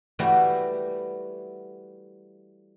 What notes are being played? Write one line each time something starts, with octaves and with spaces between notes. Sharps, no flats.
E3 G3 A3 E4 F#4